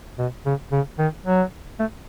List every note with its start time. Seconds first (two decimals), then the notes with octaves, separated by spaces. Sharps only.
0.19 B2
0.46 C#3
0.72 C#3
0.99 D#3
1.26 F#3
1.80 A3